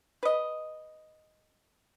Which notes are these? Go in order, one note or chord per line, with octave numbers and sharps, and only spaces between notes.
B4 D#5